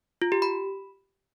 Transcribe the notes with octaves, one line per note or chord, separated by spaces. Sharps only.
F4
G4
B5